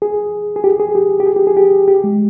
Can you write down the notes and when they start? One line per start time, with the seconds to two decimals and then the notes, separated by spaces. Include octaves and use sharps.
0.02 G#4
0.56 G#4
0.64 G4
0.80 G#4
0.95 G4
1.20 G4
1.26 G#4
1.36 G4
1.47 G#4
1.57 G4
1.88 G4
2.04 G#3